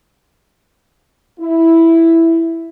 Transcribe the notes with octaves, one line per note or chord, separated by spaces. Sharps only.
E4